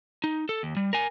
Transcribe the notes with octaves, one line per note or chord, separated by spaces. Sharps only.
D#4
A4
D#2
G3
A#4 G#5